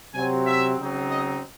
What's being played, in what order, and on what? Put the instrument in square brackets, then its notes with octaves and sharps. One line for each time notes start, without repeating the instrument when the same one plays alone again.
[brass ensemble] C3 F#3 C4 G#5
E5
C#3 F#3 C4 D#4
D#5